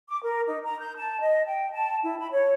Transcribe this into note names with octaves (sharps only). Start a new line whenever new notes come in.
D6
A#4
D#4
A#5
G6
A5
D#5
G5
A5
E4
B5
C#5